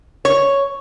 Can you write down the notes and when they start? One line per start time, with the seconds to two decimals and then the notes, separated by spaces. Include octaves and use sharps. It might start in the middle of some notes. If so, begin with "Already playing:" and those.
0.25 C#5